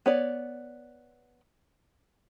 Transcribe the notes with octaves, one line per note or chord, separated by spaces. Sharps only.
B3 C#5 D5